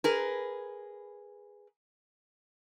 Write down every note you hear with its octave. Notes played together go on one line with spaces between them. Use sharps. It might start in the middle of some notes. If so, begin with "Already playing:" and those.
G#4 A#4 B4